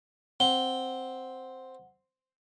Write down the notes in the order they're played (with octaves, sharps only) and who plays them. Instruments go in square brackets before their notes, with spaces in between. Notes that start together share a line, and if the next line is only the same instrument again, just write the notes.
[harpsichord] C4 [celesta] F#5 G7